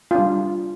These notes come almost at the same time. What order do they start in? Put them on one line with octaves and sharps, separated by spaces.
F4 D4 G3